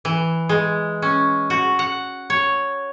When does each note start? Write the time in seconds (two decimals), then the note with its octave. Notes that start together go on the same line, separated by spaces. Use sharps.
0.05 E3
0.49 G#3
1.02 C#4
1.50 F#4
1.79 F#5
2.30 C#5